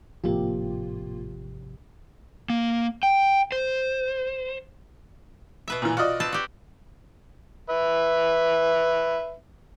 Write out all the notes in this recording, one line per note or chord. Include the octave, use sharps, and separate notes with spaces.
G#1 A2 C3 F3 A#3 F4 G4
A#3
G5
C5
B2 B4 E5
A#2 E3
F4 F#4 D5 D#5
C4 B4 A5
F#4 G4
B4 E5